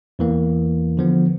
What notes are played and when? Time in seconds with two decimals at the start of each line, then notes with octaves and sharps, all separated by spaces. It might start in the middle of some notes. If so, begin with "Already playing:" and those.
0.19 E2 E3 A#3
0.97 D3 F3 B3